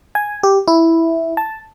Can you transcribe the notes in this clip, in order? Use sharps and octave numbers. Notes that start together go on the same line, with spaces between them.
G#5
G4
E4
A5